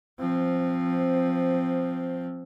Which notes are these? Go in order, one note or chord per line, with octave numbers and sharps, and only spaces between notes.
F3 C4